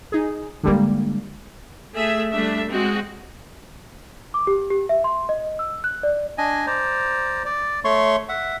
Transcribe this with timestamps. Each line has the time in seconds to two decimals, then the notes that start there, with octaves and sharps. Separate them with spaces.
0.12 D#4 G#4
0.64 G2 D3 G3 G#3 A#3
1.92 A3 G#4 E5
2.31 G3 A3 D4 E5
2.69 G#3 C4 F#4
4.34 D6
4.47 G4
4.71 G4
4.89 E5
5.04 C6
5.29 D#5
5.59 E6
5.84 F#6
6.03 D5
6.38 D4 D#5 G#5
6.67 C5 D5 A#5
7.45 D5
7.85 A3 C#5 C6 C#6
8.29 E5 F#5